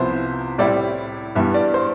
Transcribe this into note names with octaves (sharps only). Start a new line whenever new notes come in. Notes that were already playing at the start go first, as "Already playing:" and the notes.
Already playing: C2 C3 F3 B3 E4 C5
A2 G3 C4 E4 D5
G2 E3 G3 B3 E5
D5
C5